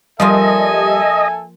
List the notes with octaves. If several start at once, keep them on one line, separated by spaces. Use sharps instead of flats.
F3 G3 A#3 F4 A4 D#5 E5 G#5